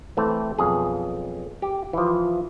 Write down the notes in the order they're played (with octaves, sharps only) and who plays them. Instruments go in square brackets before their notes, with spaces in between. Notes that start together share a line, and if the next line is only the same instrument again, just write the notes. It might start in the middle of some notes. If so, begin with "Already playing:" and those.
[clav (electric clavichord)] E3 A3 C4
B1 F2 G#4
G4
E3 F3